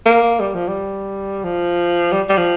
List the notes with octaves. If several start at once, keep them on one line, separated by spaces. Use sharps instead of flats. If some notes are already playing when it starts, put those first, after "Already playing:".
A#3
G3
F3
G3
F3
G3
G3
F3